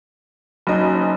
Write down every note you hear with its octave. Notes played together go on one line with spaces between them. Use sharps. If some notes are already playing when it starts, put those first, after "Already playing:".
F#1 F#3 C#4 D#4 D#5